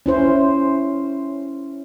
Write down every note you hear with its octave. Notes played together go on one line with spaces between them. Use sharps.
C#4 E4 C5